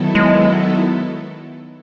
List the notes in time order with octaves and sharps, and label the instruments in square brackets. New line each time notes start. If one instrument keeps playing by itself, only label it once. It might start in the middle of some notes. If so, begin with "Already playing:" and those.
Already playing: [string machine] D#3 F#3 B3 E4 A4
[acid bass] G#3